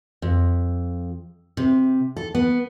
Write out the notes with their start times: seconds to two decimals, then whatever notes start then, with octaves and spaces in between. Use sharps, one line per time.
0.22 F2
1.57 C3
2.17 A4
2.35 B3